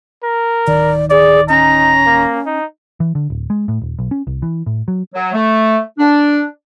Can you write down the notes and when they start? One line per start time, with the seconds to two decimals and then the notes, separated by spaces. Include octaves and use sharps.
0.23 A#4
0.67 D1 D#3 D5
1.11 G#4 D5
1.49 C#4 D#4 A#5
2.06 A#3
2.46 D#4
3.00 E3
3.15 D3
3.30 D1
3.50 G#3
3.68 A2
3.82 D#1
3.99 B1
4.11 C#4
4.27 C2
4.42 E3
4.66 A2
4.88 F#3
5.14 F#3
5.33 A3
5.98 D4